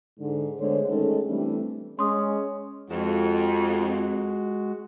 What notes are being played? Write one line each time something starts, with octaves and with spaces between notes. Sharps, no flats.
G#2 D3
D3 G#3 A3 B3 C5 C#5
D#3 G#3 A3 C#4 D#4 A4
C3 E3 G3 A3 C4 D4
G#3 C#4 C6 D#6
F2 G#3 F#4